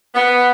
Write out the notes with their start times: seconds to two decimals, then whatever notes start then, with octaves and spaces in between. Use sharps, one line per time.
0.14 B3